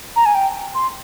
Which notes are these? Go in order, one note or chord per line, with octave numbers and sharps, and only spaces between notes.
A#5
G#5
G5
C6